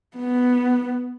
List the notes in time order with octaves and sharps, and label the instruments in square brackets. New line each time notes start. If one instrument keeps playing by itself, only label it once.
[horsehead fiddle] B3